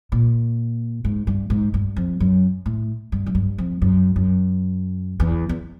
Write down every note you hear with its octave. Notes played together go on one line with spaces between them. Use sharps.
A#2
G#2
G2
G#2
G2
F2
F#2
A2
G2
F#2
G2
F2
F#2
F#2
E2
E2